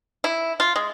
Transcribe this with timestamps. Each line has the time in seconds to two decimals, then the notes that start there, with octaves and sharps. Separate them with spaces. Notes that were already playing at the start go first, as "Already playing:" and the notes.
0.24 E4
0.60 F4
0.76 G#3